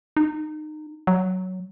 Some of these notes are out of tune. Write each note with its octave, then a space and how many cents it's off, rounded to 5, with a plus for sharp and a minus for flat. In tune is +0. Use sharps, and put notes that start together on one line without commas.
D#4 -25
F#3 +5